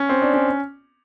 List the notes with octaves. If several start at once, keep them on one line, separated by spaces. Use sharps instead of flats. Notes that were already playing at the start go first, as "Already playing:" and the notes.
Already playing: C#4
C4
D4
C#4